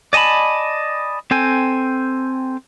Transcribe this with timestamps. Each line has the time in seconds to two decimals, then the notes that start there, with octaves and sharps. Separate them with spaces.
0.13 D5 D#5 G#5 A5 B5
1.31 C4 A4 G5 G#5